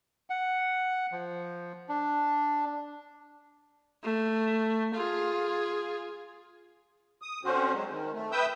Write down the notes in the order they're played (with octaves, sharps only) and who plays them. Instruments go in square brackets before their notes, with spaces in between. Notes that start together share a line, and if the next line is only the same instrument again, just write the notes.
[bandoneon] F#5
F3
D4
[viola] A3
F4 G#4
[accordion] D#6
D3 C4 C#4 F#4 C5
F#3 G#3
D#3
A3
B4 E5 G5 D#6 E6 G6